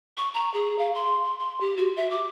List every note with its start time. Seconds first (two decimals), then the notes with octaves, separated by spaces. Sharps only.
0.17 C#6
0.34 A#5
0.54 G#4
0.79 F5
0.95 C6
1.25 C6
1.39 C6
1.60 G4
1.77 F#4
1.97 E5
2.10 D6